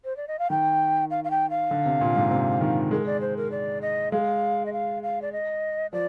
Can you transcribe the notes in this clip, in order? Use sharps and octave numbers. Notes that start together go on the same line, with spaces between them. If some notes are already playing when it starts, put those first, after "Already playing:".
C5
D5
D#5
F5
D#3 G5
F5
F5
G5
F5
D3
C3
A#2
G#2
C3
D#3
G#3 A#4
D5
C5
A#4
D5
D#5
G#3 F5
D#5
F5
F5
D5
D#5
F3 D5